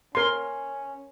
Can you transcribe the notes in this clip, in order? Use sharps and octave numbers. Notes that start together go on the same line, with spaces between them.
C#4 A#4 C6